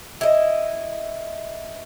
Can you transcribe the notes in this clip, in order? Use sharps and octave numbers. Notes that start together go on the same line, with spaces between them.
E4 D#5